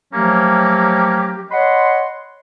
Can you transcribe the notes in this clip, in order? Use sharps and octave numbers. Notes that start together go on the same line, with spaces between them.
F3 F#3 A3 A#3 C#4 G4
C#5 D#5 F#5 B5 C6